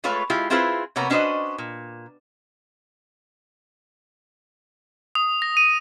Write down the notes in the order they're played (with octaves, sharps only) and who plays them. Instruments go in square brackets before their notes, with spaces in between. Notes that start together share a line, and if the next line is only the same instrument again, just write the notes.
[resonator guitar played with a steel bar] G#3 A3 F4 B4 C#5 F5
G#3 E4 F4 G4
C4 E4 F4 G#4 B4 C5
C3 A#3 B3 C#5 A#5
C#4 D4 F#4 B4 C5 D#5
A#2
[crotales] D#6
A#6
D#7